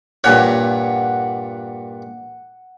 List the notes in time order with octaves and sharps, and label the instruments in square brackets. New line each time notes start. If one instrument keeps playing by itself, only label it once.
[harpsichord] G2 A#2 C#5 [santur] F#5